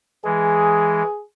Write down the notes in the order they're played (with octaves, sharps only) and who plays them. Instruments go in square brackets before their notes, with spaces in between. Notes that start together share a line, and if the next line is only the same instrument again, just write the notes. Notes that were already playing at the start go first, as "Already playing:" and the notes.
[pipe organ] E3 G#3 [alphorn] G#4